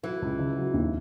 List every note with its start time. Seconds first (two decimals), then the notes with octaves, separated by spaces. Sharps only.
0.03 E3 F#3
0.22 C#2
0.39 C#3
0.57 F#3
0.74 D#2